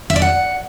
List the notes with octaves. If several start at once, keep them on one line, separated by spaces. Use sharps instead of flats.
E5
D5
F#5